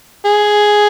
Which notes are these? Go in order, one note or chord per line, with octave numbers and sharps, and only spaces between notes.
G#4